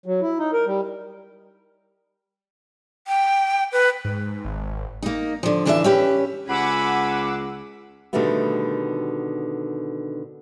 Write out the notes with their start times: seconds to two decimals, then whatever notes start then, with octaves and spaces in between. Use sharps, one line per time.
0.06 F#3
0.21 E4
0.39 D#4
0.53 A#4
0.66 G3
3.07 G5
3.72 B4
4.05 G#2
4.45 G#1
5.03 A#3 D#4
5.43 D3 F3
5.65 D3 E3 D4 F4 C5 E5
5.84 C#4 G4 B4
6.49 C#2 F#5 G#5 B5 D6 E6
8.13 B2 D3 D#3 G3 A3 B3